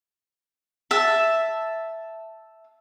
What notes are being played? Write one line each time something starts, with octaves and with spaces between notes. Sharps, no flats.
E5 A5